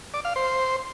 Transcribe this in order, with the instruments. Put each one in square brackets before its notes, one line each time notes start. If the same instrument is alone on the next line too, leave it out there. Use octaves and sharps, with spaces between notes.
[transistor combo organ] D5
F5
C5